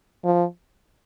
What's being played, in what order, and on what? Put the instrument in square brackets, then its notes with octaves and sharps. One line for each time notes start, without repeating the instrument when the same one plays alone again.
[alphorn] F3